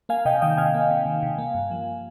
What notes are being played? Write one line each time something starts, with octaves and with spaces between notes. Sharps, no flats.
A#3 F5 G#5
C3 D#5 G5
D#3 D#5 G5
C3 F5 G#5
A#3
C3
D#3
C3
A#3
G2
F3